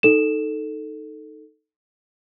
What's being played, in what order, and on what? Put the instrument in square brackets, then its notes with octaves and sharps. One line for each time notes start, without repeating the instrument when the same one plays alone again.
[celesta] D#4 A4 E7